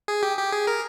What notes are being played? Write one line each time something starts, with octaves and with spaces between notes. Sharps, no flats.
G#4
G4
G4
G#4
A#4